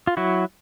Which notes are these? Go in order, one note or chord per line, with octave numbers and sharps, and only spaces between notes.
F4
F#3 E4 F#4